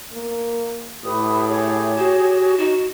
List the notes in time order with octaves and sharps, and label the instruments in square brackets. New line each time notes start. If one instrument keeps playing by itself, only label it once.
[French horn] A#3
[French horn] A2 [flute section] G4 B4 D#6
[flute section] G4 G#4 C#5
[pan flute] F#4
[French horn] D#4 [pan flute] F#4